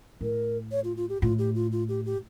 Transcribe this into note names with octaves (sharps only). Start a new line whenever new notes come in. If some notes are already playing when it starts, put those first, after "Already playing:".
A2 A#4
C#5
F4
F4
G4
A2 F4
G4
F4
F4
G4
G4